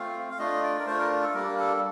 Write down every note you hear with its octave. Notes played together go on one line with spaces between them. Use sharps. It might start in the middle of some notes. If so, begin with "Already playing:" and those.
Already playing: A3 C4 F4 F5
F5
A3 D4 F4 D#5
D5
A#4
A3 D4 F4 C5
A#4
A4
G3 A#3 D4 A#4
A4